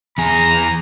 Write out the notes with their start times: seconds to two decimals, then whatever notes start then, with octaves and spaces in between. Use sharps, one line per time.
0.18 E2 G#4 A#5